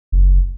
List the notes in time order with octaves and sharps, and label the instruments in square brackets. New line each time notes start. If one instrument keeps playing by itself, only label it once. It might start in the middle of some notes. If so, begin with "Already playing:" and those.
[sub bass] F#1